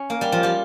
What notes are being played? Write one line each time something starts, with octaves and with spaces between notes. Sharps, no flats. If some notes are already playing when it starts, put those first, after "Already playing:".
Already playing: C#4
A#3 A#4
G3 G4
F3 F4
G3 G4